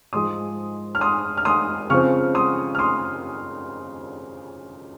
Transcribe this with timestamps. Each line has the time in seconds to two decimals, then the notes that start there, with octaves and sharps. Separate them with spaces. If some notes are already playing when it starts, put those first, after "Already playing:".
0.13 G#2 F3 G#3 C6 D#6
0.95 F6
1.01 C6 D#6
1.37 F6
1.45 C6 D#6
1.90 C#3 F3 C4 C#6 F6
2.34 C6 D#6
2.75 F6
2.79 C6 D#6